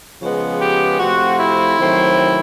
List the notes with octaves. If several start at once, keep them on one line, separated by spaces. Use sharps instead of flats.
C#3 F3 G#3 B3
G4
C3 F3 A3 C4 F#4
E4
C3 D#3 F#3 A3 C4